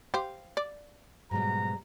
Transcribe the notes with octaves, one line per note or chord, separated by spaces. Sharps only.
G4 C5 F5
D5
G#2 B2 F#3 G3 A#5